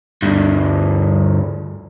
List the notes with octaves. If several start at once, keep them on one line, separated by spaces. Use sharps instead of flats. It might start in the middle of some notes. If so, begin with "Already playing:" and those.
D2 G2